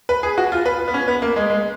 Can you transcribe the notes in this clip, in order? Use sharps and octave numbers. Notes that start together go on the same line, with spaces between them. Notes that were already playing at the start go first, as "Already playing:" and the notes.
B4
G#4
F#4
F4
B4
B3
C#4
B3
A#3
G#3
G#3